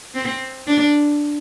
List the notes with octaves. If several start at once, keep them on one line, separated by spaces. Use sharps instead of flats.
C4
D4